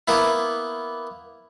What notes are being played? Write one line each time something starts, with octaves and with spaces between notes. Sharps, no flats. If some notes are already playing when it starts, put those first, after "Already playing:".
A#3 B3 E4